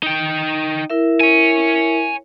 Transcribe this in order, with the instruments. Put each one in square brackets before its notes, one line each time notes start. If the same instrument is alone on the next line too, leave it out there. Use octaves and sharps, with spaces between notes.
[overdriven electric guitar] D#4 G5
[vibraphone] E4 A#4 E5
[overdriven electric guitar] C#5 G#5